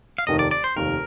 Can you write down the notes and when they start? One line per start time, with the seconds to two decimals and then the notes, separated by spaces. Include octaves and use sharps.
0.18 F5
0.27 F1 D#2 D#3 D#5
0.39 D5
0.51 D5
0.64 C5
0.76 F1 D#2 D#3 A#4